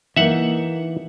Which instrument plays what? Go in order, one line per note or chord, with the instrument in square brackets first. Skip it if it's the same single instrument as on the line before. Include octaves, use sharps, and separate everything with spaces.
[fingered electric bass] E3 [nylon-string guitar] A#3 D#4 [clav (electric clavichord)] E5 F#5